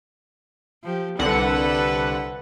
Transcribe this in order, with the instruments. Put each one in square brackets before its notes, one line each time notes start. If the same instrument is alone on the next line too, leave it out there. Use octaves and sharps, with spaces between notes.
[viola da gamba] F3 G4
[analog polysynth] C2 D3 F#5 [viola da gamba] A4 B4